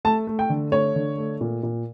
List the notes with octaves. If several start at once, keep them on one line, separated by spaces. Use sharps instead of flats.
A3 A5
A3
G5
D3
A3 C#5
D3
A3
A#2
A#2